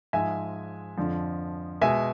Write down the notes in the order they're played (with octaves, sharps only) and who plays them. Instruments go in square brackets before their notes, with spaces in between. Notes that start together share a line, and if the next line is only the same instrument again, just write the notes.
[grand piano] G#2 F3 G#3 E5 G#5
F2 D3 F3
B2 G#3 E5 G#5